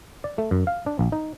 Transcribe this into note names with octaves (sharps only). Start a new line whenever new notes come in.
D5
A3
F#2
F5
D4
A#1
D#4